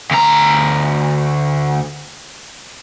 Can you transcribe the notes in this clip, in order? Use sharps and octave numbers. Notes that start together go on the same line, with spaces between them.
D2 A#5